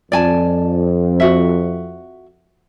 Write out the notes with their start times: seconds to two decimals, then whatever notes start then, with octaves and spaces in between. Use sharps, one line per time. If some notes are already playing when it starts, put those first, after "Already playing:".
0.12 F2 D5 G#5 A5
1.20 F#4 E5